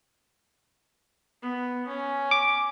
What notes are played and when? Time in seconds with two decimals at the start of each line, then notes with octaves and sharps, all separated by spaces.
1.43 B3
1.88 C#4
2.31 D6